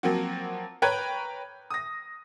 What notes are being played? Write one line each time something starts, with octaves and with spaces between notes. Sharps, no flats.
F3 F#3 A#3 C4 F#4
B4 C#5 G5 A#5 F#6 G#6
D#6 A#6